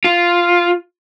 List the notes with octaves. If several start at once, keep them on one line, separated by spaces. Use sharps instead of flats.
F4